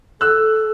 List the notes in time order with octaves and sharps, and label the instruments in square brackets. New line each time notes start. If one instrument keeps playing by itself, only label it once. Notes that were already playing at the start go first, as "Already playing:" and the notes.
[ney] A4 [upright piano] E6 F#6